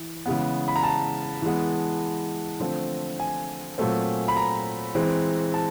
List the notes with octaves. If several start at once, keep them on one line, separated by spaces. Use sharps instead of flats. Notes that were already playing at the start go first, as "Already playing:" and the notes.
Already playing: E3
C#3 E3 G#3 B3
B5
A#5
A5
E3 G#3 B3
D3 F3 A3 C4
G#5
A#2 F#3 A3 C4
B5
A#5
E3 G#3 C4
A5